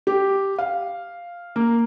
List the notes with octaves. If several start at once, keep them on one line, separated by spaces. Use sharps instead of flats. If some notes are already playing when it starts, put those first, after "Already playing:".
G4
F5
A#3